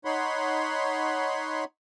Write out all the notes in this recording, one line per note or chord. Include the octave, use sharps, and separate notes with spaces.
D#4 C#5 F#5 B5 C6